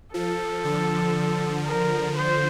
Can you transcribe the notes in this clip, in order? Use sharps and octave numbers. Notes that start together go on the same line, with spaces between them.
F3 A4
D3
A#4
C5